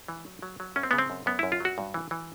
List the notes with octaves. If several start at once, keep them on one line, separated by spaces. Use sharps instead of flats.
E3
F#3
F#3
F#3
F#2 C#4
C4
C#3 B3
C4
F#2
F#2 B3
F#2 E4
F4
F#3 F#4
G2
E3
E3